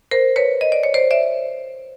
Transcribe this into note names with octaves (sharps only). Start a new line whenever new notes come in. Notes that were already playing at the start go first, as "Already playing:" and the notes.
A#4 C5
B4 C#5
D#5
D5
C#5
C5 D5
D5 E5